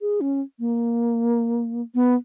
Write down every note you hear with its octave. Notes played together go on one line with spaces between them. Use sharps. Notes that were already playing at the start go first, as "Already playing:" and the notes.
G#4
C#4
A#3
B3